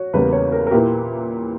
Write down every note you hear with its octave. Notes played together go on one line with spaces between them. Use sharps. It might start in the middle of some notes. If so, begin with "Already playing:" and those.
Already playing: F#4 C#5
E2 C#3 G3 A#3 B4
C#5
A#4
A#4
A#2 A#3 E4 G4 B4